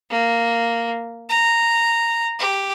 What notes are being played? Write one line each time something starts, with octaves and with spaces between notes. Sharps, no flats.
A#3
A#5
G4